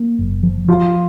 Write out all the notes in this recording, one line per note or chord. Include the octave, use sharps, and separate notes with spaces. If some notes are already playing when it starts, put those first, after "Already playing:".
Already playing: A#3
F#1
F3
F3 F4